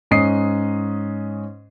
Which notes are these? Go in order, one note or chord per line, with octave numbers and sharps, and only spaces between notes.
G#2 C#4 D#5 D#6 C7